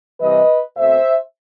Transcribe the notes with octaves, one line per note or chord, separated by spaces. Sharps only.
C3 E3 G3 B4 D#5
B2 A3 C4 C5 E5